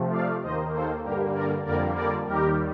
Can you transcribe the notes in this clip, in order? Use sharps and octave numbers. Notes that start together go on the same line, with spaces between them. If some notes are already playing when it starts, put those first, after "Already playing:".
Already playing: C3 F3 A3
D5 F5
D#2 D#3 A#3 C5 D#5
A4 C5
G2 D3 G3 A#3 G4 A#4
A#4 D5
F2 D3 G3 A#3 A#4 D5
A#4 D5
D#2 D#3 G3 G4 A#4